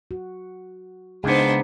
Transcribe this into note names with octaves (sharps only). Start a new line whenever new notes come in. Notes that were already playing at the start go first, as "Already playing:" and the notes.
F#4
C#2 B3 D4 D#4 G#4 C5